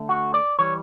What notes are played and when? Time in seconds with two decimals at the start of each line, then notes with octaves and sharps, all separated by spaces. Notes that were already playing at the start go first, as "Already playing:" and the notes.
Already playing: D3 A3
0.09 F#4
0.34 D5
0.59 E3 G3 C#5